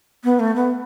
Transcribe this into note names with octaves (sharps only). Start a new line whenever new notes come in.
B3
A3
B3